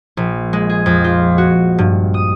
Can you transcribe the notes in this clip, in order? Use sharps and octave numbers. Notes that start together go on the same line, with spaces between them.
A#1
G#3
G#4
F2
F4
F#4
G2
D#6